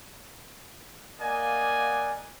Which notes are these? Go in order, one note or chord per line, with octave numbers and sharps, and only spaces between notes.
A#3 D5 D#5 F5 F#5 G#5